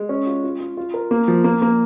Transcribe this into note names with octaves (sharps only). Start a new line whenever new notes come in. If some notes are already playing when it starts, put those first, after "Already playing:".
Already playing: G#3
C#4
F4
F4
F4
F4
A#4
A#3
F3
A#3
A#3